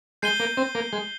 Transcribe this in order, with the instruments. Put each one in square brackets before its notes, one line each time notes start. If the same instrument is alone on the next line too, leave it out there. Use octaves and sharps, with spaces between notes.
[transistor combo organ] G#3 [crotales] G6 C7 D#7 G7
[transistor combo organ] A#3
C4
A#3
G#3